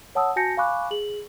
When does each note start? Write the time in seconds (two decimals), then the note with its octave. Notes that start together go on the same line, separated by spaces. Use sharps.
0.15 C#5 F#5 A5 D#6 E6
0.36 F#4 G#5 A5 G6 A#6 C#7
0.57 F5 G#5 B5 C#6 D6 F#6
0.91 G#4 F#7